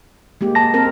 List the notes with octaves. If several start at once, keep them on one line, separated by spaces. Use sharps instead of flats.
G#3 A#3 G4
A5 A#6
C4 A#4